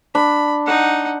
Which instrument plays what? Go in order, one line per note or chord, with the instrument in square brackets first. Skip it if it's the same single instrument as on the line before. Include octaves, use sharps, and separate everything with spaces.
[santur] D4 [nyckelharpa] B5
[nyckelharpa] D#4 F#5